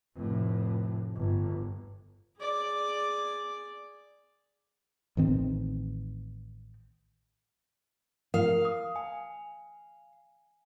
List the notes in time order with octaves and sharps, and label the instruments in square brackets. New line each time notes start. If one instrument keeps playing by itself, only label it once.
[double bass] F1 A2
G1
[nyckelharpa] G#4 D5
[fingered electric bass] A1 D#3 C4
[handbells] A#4 [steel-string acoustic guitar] F5
[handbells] D#6
G#5